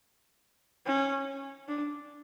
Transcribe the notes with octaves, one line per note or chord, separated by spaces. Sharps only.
C#4
D4